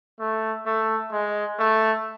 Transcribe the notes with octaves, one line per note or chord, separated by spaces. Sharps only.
A3
A3
G#3
A3